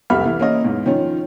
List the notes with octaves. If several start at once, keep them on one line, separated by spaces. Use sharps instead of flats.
F1 C2 G4 E5 B5 F6
E3
A#3 C#4 D#5
E2 G#2
D#3 F3 C#4